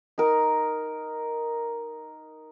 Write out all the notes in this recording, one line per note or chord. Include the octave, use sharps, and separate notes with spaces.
D#4 A#4